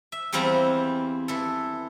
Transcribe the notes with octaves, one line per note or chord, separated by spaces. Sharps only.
E5
E2 E3 G3 C4 F5 A#5
E3 A4